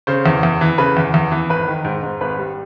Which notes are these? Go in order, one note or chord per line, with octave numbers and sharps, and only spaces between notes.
C#3 C5
E2
E2
E3
C#3 B4
E2
E2
E3
G#1 B4
D#3
G#2
G#2
G#1 B4
G3